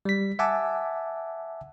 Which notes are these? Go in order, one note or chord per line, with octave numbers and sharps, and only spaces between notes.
G3 B6
E5 F#5 G#5 A5 D6